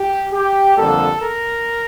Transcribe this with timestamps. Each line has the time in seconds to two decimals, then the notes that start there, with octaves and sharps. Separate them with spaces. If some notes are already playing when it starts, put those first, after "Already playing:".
Already playing: G4
0.33 G4
0.76 F2 D3 G3 A#3 A4
1.20 A#4